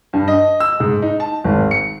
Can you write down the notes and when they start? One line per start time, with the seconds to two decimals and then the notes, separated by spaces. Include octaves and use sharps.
0.13 G2
0.28 D#5
0.60 E6
0.80 G#2
1.02 D#4
1.20 A5
1.44 G#1
1.71 C#7